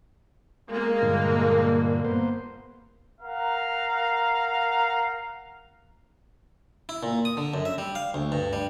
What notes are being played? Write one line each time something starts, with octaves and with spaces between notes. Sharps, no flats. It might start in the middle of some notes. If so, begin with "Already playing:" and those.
G#3 A#3
G2 A#2 D3
A#3 B3 C5
A#4 F5 F#5 A#5
E4
A#2
D#6
D3
F#2
E5
G3
F5
D2
G2
G3